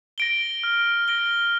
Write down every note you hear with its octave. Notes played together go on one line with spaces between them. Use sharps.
A#6 D7 G7
F6
A#6 D7 G7